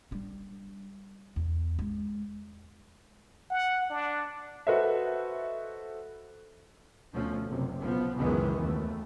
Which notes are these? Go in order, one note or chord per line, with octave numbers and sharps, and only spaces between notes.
G3 D4
E2
G#3
F#5
D4
F#4 A4 B4 C5 D#5 E5
D2 B2 F3 A3 C#4
F#1 C3
B1 F3 B3
C#2 F#2 D#3 E3 G#3 B3
D#2 A3